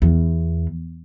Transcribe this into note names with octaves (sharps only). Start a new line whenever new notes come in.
E2